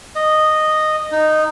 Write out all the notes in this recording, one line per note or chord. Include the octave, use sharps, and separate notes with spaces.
D#5
D#4